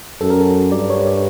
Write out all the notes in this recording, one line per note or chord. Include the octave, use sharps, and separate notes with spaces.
F#2 A4
A#4
A4
G2 D5
C#5
D5